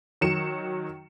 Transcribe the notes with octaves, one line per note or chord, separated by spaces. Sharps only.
D#3 F#3 C#7 E7